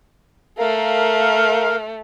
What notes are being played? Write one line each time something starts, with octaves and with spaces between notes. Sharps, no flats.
A3 A#4 F5